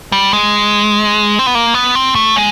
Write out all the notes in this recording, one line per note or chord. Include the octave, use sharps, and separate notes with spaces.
G3
G#3
C4
B3
A#3
B3
C4
A3
G#3